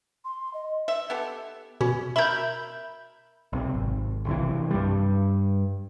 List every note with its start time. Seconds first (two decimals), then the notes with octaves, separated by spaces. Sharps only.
0.25 C6
0.54 D#5
0.88 E5
1.10 B3 G4 A4
1.81 B2 C#4
2.16 A#4 E5 B5 G6
3.53 B1 C3
3.75 G#1
4.26 B1 C3 E3
4.71 G2 G3